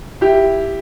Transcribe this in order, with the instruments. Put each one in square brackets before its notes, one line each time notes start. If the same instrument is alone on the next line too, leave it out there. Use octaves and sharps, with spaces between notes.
[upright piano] E4 G4